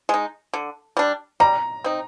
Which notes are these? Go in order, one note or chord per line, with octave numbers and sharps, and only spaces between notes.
G#3 D#4
D3
G3 D4
G3 A#5
C4 D#4